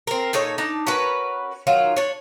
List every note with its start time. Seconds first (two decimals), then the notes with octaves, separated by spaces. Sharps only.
0.07 C4 A#4
0.33 A#2 D#4 A4 C#5
0.58 D4 D#4 A5
0.87 C#4 F#4 A#4 B4
1.67 D#3 F#3 F4
1.97 D4 C#5